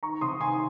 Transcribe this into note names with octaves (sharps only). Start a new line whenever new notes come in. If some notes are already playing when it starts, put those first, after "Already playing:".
D#3 A#5 C#6
C3 C6 D#6
D#3 G#5 C6